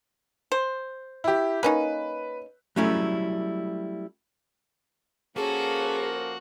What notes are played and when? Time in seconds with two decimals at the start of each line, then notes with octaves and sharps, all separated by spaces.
0.52 C5
1.24 E4 G4
1.63 A#3 C#4 D#4 B4
2.76 F#3 G3 A3 C#4 E4
5.36 F3 A#3 C#4 F#4 G#4 A4